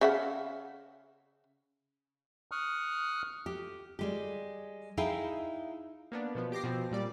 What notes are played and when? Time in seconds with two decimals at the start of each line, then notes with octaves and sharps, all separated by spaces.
0.01 C#3 E5 F#5
2.52 C#6 D#6 F6 F#6
3.46 G4
3.99 G3 G#3 G4
4.97 D#4 E4 G#4 E5 F5 G5
6.12 A#3 B3 D4
6.35 B2 F3 B3
6.52 G4 D6 A#6 C7
6.64 B2 F3 C4
6.91 A#2 G3 D5